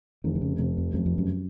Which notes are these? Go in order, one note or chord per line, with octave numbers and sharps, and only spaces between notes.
F1 D#3
D#3
C#3
F1 C3
F2
F1 F#2
F2
F#2